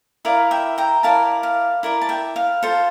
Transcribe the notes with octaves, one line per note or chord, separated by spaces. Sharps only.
E4 A#4 D5 F5
E5 G5
G5 A#5
E4 A#4 D5 F5 A5
F5
E4 A#4 D5
A5
E5 G5
F5
F4 A4 C5